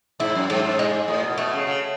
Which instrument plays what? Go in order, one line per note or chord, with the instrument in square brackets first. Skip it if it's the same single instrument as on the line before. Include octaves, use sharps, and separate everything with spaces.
[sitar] G#2 [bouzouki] E4
[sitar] F#2
[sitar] G#2 [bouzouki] A3
[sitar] G#2
[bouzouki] G#3
[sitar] A2
B2
[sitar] B2 [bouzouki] A3
[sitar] C#3
C#3